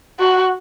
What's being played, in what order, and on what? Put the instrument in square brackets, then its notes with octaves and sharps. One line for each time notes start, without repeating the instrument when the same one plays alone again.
[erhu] F#4